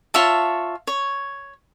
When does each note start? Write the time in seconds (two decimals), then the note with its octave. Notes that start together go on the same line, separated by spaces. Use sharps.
0.14 F4 C#5 E5 A5
0.87 C#5